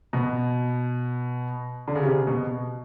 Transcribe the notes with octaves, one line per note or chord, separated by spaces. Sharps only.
B2
D3
C#3
C3
B2